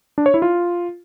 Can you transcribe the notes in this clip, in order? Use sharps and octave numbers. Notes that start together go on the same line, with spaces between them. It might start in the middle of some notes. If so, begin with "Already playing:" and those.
D4
C#5
E4
F4